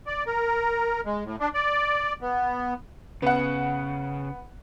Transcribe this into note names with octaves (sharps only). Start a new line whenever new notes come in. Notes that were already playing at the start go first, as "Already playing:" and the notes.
D5
A#4
G#3
A2
D4
D5
B3
C#3 B3 F#5